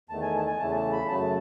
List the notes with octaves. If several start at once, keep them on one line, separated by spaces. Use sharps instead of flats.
E2 D#3 A3 A5
G#5
A5
G#5
E2 C#3 E3 A3 A5
A5
B5
F#2 C#3 F#3 A3 A5